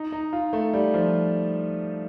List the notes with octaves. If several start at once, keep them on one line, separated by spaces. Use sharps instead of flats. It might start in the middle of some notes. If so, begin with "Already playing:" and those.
Already playing: D#4
D#4
F4
A3
G3
F3